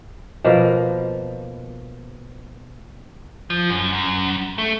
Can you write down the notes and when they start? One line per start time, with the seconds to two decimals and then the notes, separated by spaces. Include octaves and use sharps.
0.44 B2 F3 A#3
3.50 F3
3.70 F#2
3.93 F#2
4.58 A3